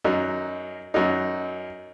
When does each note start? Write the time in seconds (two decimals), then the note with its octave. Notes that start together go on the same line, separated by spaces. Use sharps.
0.04 F#2 F#3 D#4
0.94 F#2 F#3 D#4